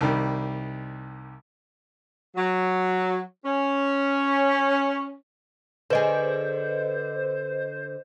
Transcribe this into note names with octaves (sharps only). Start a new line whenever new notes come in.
C2 D#3 G3
F#3
C#4
D3 G#4 B4 C5 D#5